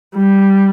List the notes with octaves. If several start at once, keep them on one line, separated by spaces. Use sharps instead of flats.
G3